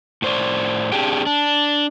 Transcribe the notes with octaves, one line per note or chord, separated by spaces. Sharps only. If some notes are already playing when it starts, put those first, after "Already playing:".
A2 C5 D5
C4 D4 G4 G#4 G5
D4